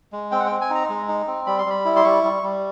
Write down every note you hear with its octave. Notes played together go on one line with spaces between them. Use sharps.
G#3
C4 G5
F#5
C4 G5
G#5
D#4
A#5
G#3
D#4
C4
G3 B5
C6
G3 B5
E4
C6
G3 C#6
G3
G3